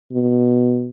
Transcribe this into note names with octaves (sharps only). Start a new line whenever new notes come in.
B2